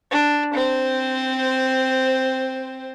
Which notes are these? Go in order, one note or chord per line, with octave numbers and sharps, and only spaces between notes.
D4
C4 C5